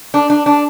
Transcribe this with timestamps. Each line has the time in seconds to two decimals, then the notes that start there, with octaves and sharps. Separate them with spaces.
0.14 D4
0.30 D4
0.46 D4